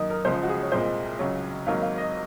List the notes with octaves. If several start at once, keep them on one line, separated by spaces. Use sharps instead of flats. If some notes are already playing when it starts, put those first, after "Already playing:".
Already playing: F#2 D#3 A#3 D#4
A#4
C#2 C#3 F3 G#3 C5
F#4
G#4
C#5
C2 A#2 G#3 C5
C#2 C#3 F#3 C#5
G#1 G#2 F#3 A#3 F5
F5
D#5